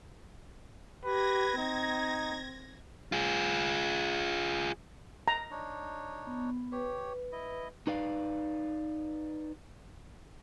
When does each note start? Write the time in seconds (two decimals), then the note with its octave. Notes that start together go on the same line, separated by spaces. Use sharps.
1.04 G4 B4 G#6 A#6
1.58 C4 D#4
3.12 F4 G#4
5.28 A#5
5.51 D4 D#4 C#5
6.27 B3
6.72 G4 B4 C#5
7.32 E4 D#5
7.87 D#4 B4 D5 F5